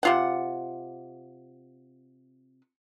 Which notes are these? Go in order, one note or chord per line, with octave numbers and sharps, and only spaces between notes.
C3 F4 F#5